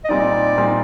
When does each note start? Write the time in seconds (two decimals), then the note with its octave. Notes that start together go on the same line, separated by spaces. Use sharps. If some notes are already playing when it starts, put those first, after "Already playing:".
0.05 D#5
0.09 A#2 G3 C4 D#4 D5
0.56 A#2 G3 C4 D#4